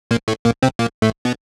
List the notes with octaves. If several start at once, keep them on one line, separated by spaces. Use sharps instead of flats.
A#2 A#3
A2 A3
A#2 A#3
C3 C4
A#2 A#3
A2 A3
B2 B3